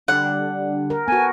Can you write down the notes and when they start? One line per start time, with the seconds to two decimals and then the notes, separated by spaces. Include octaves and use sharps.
0.08 D3 G3 D4 F#5
0.90 A#4
1.08 B3 F#4 A4 G#5